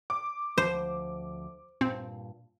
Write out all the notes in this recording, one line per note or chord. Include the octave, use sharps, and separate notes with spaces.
D6
D2 F3 C5
G2 A#2 C4